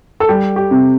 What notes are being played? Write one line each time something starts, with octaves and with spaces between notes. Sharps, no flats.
A4
G3 G4
G4
C3